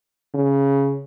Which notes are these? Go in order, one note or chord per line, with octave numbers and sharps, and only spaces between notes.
C#3